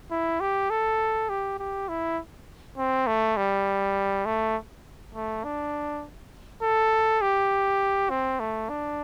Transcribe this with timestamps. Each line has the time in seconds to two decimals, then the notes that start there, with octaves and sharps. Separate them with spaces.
0.11 E4
0.41 G4
0.70 A4
1.29 G4
1.59 G4
1.89 E4
2.78 C4
3.07 A3
3.37 G3
4.26 A3
5.15 A3
5.44 D4
6.62 A4
7.22 G4
8.10 C4
8.40 A3
8.69 D4